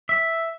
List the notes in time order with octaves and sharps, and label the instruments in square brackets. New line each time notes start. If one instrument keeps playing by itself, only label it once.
[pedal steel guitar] E5